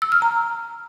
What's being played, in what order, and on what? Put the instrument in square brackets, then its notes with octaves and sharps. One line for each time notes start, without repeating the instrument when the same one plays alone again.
[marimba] E6
F6
A#5